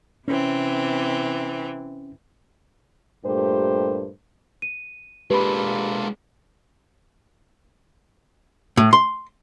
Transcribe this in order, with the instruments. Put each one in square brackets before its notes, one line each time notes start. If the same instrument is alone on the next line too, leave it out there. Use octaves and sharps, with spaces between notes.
[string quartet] C3 E3 C4 [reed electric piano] C#4
[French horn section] G2 A#2 A3 G4 A#4 C5
[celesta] D#7
[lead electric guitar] G#3 D4 [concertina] A#3 F4 A4 [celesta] G4 B5 [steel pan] B4
[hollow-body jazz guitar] A2
C6